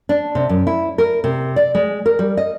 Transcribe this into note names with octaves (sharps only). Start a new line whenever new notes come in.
D4
C3
F#2
E4
A#4
C3
D5
G#3
A#4
G3
D#5